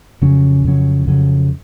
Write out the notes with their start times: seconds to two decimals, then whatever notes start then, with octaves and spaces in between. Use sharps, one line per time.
0.22 F2 C#3 F#3 C#4
0.64 F2 C#3 F#3 C#4
1.07 F2 C#3 F#3 C#4